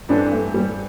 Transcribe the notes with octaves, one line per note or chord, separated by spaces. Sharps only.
G2 E3 C4 D4 A4 C5
A3
G3